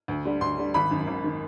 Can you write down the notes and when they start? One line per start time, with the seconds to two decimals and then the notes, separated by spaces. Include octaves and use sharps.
0.08 D2
0.25 D3 G3
0.41 D2 C6
0.58 D3 G3
0.74 G#1 B5
0.91 F#2 D#3
1.07 G#1
1.24 D#3